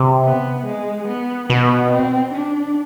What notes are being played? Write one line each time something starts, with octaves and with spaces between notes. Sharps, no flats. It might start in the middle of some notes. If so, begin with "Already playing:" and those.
Already playing: C3
B3
G#3
B3
B2 B3
C4
D4